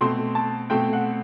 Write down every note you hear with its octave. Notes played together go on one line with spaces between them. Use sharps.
B2 A3 C4 C6
A5
B2 A3 C4 G5
F#5